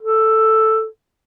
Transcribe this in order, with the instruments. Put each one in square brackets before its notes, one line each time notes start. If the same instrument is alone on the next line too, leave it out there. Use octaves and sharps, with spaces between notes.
[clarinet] A4